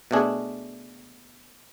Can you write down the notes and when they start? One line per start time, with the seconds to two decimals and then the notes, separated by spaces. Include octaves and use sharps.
0.11 B2 A3 D4 G#4